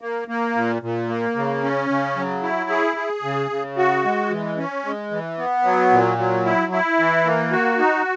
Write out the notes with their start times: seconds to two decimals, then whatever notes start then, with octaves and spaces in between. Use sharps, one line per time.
0.01 A#3
0.28 A#3
0.55 A#2
0.82 A#2
1.09 A#3
1.36 C#3
1.63 C#4
1.90 C#3
2.16 F#3
2.42 E4
2.70 G#4
2.97 G#4
3.23 C#3
3.50 C#3
3.77 F#4
4.04 G#3
4.30 E3
4.57 C#4
4.85 G#3
5.11 E3
5.38 B3
5.64 F#3
5.91 A#2
6.18 F#3
6.45 E4
6.72 E4
6.99 E3
7.25 A#3
7.52 F#4
7.79 D#4